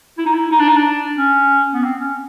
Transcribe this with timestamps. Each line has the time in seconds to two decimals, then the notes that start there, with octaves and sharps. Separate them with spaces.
0.18 E4
0.26 D#4
0.34 E4
0.51 D#4
0.59 D4
0.68 D#4
0.76 D4
1.18 C#4
1.74 B3
1.84 C4
2.00 C#4